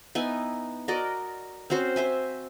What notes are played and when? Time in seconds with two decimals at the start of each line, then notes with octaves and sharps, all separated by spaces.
0.15 B3 D#4 E4 G#5
0.88 F#4 A#4 D5 D#5
1.70 C4 C#4 F#4 C5
1.96 C5 E5 G#5